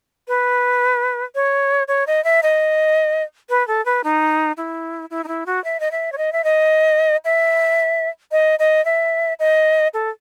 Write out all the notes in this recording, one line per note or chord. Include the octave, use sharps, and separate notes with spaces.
B4
C#5
C#5
D#5
E5
D#5
B4
A4
B4
D#4
E4
E4
D#4
E4
F#4
E5
D#5
E5
C#5
D#5
E5
D#5
E5
D#5
D#5
E5
D#5
A4